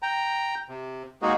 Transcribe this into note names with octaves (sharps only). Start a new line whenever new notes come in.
G5 A#5
C3
G#3 A#3 D#4 F#4 G#4